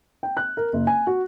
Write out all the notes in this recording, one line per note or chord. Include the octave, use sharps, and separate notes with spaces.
G5
F#6
A#4
F#1
G#5
F#4